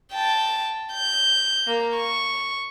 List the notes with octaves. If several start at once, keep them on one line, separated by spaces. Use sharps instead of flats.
G5 A5
G6
A#3
C#6